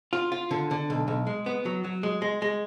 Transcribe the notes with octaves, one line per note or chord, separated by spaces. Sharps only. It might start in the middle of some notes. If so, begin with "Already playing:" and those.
F4
F4
D3
D3
B1
B1
G#3
B3
F#3
F#3
G#3
G#3
G#3